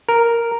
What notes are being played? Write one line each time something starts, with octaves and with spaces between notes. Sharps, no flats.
A#4